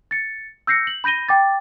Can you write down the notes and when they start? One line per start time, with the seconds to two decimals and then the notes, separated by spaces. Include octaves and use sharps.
0.11 A6 C#7
0.67 E6 G6 A#6 C7 C#7
0.87 F#7
1.04 B5 G6 A#6 D#7 G7
1.29 G5 D6 A6